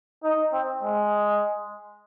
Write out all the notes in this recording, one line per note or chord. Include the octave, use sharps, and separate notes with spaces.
D#4
C4
G#3